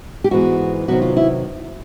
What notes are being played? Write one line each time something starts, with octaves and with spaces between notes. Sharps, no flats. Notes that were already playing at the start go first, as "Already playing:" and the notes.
G4
G#2 E3 G#3 B3 F#4
C3 D#3 F#3 B3 F#4
F4
E4